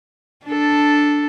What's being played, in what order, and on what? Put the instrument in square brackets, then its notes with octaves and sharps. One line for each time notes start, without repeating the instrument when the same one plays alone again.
[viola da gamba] D4 A4